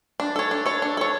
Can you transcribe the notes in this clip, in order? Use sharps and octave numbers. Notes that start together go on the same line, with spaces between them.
D4
A4 C#5
D4
A4 C#5
D4
A4 C#5